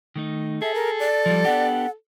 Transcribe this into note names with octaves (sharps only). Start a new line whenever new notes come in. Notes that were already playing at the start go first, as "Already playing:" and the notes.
D#3 A3 D#4
G#4 A4 E5
A#4
D5
F3 G3
B3 D4 G4 F#5